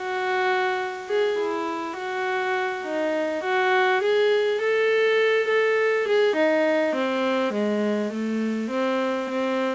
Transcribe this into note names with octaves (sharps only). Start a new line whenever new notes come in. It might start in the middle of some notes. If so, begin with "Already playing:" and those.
Already playing: F#4
G#4
E4
F#4
D#4
F#4
G#4
A4
A4
G#4
D#4
C4
G#3
A3
C4
C4